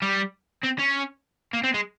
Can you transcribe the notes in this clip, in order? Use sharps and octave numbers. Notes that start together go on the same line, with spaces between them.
G3
C4
C#4
A#3
C4
G#3